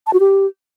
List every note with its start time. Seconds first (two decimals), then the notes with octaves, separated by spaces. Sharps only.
0.07 A5
0.13 F#4
0.20 G4